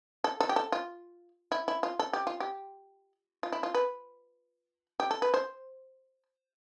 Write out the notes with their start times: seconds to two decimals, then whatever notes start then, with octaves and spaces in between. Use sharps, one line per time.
0.24 A4
0.40 A4
0.49 G4
0.56 A4
0.72 F4
1.52 E4
1.68 E4
1.83 F4
1.99 A4
2.13 G4
2.27 F4
2.40 G4
3.43 F4
3.52 E4
3.63 F4
3.74 B4
5.00 G4
5.11 A4
5.22 B4
5.34 C5